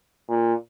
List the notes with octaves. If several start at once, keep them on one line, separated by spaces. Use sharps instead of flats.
A#2